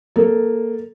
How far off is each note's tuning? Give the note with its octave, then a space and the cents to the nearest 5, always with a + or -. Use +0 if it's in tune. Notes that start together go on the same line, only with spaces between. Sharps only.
A#3 +0 A4 -10